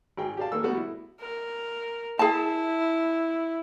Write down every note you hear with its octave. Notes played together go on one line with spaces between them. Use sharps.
G#1 G#4 G5
G4 G#4 D5 F5 A5
D#3 A#3 A4 A#4 E6
G3 A3 B3 F#4
E4
A#4
E4 G#4 A5